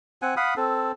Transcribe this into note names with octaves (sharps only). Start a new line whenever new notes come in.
C4 F#5 G#5
F5 F#5 B5 D#6
C4 A4